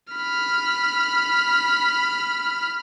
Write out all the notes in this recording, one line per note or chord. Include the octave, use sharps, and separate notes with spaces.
B5 F6